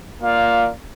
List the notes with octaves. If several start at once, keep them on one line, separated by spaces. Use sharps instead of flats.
A#3 F4 D5 F5